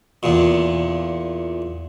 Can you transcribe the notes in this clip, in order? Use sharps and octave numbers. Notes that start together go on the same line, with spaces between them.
E2 A#2